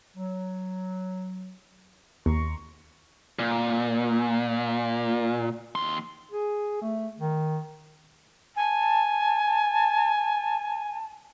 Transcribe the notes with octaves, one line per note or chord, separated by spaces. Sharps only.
F#3
D#2 A#5 C6 C#6
A#2
D#2 C6
G#4
A3
D#3
G#5 A5